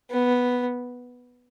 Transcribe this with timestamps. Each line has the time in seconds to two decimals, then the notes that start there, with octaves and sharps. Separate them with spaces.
0.10 B3